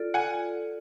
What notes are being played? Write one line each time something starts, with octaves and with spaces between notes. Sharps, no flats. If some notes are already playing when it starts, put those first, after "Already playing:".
Already playing: F4 A4 D5
F#5 G#5